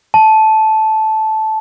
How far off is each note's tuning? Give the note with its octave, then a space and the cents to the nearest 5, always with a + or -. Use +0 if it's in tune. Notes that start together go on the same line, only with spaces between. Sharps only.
A5 -10